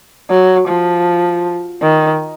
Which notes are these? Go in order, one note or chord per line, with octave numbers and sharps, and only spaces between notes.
F#3
F3
D#3